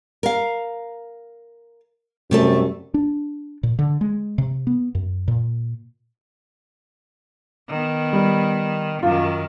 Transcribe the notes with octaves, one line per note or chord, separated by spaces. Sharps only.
A#4 F5
F#2 C3 G3 A3 A4
D4
A#2
D3
G#3
C3
B3
F#2
A#2
D#3 B3
G3
F#2 D#3 F4